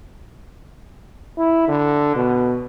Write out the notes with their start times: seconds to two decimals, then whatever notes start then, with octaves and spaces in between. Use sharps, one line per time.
1.38 E4
1.68 D3
2.15 B2